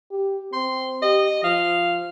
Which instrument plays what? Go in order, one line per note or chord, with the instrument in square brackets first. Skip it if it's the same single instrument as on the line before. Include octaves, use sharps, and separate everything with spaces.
[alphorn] G4
[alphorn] C4 [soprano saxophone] C6
[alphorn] G4 [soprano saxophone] D#5
[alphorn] F3 [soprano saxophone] F5